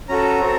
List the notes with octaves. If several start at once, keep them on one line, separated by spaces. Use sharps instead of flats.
C#4 F#4 A4 A#5
C4 F#4 A4